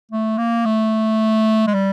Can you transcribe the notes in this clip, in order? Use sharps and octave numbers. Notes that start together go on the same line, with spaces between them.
A3
A#3
A3
G#3
G3